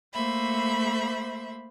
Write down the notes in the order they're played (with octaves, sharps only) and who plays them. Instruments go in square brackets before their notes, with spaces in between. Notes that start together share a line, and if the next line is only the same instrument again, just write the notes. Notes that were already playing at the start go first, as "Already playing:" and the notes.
[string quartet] A3 A#3 C5 E5 B5